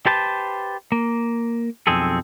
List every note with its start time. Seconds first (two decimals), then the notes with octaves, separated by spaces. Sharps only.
0.06 G4 B4 C5 A5
0.92 A#3
1.87 B1 F2 C4 G#4 A4